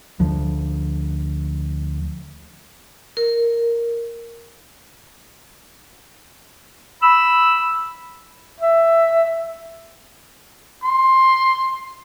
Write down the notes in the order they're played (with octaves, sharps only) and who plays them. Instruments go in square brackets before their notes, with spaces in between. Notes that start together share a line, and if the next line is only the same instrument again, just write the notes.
[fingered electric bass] D2 F3
[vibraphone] A#4
[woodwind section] B5 E6
[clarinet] E5
[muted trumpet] C6